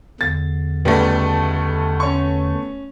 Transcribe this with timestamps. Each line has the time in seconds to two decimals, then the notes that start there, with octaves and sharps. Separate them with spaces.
0.21 E2 D3 A6
0.85 C#2 G3 A3 B3
2.00 C#4 C#6